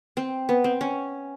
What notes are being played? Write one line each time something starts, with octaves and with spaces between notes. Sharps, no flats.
C4
B3
C4
C#4